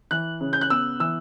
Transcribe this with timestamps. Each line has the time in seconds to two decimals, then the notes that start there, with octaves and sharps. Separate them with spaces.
0.11 E3 F#6
0.41 C#3
0.53 G6
0.61 F#6
0.70 B3 E6
1.00 E3 E6